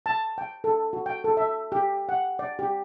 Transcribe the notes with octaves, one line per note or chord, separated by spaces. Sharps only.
A5
G5
A4
F#4
G5
A4
E5
G4
F#5
D5
G4